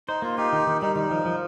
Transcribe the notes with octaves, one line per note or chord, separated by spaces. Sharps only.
D#4 C5
A#3 F4
D#4 F4 G4
D#3
D#3
G3 D#4
D#3 D#4
F3
F3